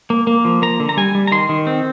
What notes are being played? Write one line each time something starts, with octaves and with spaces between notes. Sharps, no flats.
A#3
A#3
F3
A#3 A#5
D3
A#5
G3 G#5
G3
A#5
D#3 C6
D#3
C4